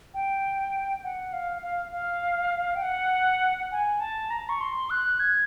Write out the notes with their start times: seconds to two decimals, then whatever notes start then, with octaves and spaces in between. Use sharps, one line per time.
0.14 G5
1.04 F#5
1.33 F5
1.62 F5
1.92 F5
2.75 G5
2.82 F#5
3.72 G#5
4.00 A5
4.30 A#5
4.49 C#6
4.61 C6
4.90 F#6
5.20 G#6